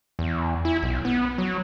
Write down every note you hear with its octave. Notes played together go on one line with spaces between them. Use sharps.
E2
E4
B1
B3
F#3